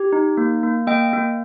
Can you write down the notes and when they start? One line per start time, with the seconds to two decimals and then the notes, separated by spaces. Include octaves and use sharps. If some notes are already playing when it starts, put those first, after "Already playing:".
Already playing: G4
0.12 D#4
0.37 A#3
0.63 A#3
0.87 A#3 D#5 G5
1.13 A#3